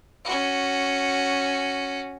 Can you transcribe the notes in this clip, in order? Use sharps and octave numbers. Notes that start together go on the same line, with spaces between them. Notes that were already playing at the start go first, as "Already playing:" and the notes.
C#4 F#4